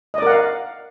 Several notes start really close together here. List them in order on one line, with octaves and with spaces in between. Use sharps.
D#5 D5 A#4 F#5 F5